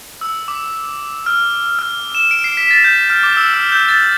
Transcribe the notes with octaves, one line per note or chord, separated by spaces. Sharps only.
E6
D6
F6
F6
E7
D7
C7
B6
A6
G6
F6
D6
E6
F6
G6
A6